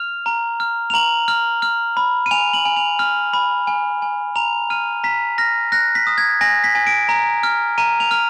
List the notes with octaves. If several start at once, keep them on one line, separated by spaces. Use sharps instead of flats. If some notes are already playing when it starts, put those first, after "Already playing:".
Already playing: F6 F7
A#5
F6
F7
A#5 F#7
F6
F6
B5
D#7
G#5 F7
F#7
G#5
F7
F6
B5
G#5
G#5
A#5 F7
F6 D#7
A#5 B6
F6 A#6
F#6 A#6
B6
D#6
G#6
G#5 A#6
B6
G#5
D7
A#5
F6
A#5 D#7
F7
F6